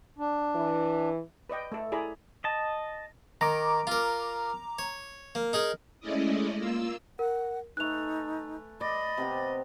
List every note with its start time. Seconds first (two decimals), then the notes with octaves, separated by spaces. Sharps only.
0.18 D4
0.55 E3
1.49 B4 D5 D#5 G5
1.72 A3 A4
1.92 E4 G#4 D5 A#5 B5
2.44 D#5 A5
3.41 D#3 A#5 D6
3.87 F4 A#4
4.79 C#5
5.35 A#3
5.53 D#4 G#4 A#4
6.00 G#3 A3 C#4 E4 D5 D#5
6.59 A#3 F4 E6
7.19 A#4 F#5
7.77 A3 D#4 B4 G#5 F#6 F7
8.81 D5 D#5 B5
9.18 C3 B3 G4